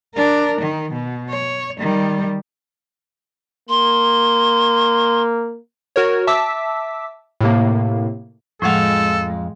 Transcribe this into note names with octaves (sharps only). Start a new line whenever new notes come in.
D4 A#4
D#3
B2
C#5
D#3 G3
A#3 C6
F#4 A#4 C#5
E5 A5 D6 E6 B6
A2 C3 A#3
F2 A2 F3 G#3 A4 F5 F#5